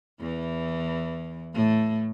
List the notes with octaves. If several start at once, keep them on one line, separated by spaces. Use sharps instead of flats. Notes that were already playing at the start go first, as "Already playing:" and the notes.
E2 E3
A2 A3